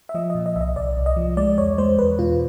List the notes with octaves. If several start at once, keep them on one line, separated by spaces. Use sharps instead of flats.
E5
F3 D#5
A#2 D#5
D#5
C2 E5
D#5
C2 D5
C2
D#5
F3
G#3 D5
E2 C#5
G#3 C5
E2 B4
B2 F4